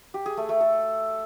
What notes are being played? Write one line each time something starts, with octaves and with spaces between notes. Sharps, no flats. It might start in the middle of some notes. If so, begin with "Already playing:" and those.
G4
G#4
A3
A3
A4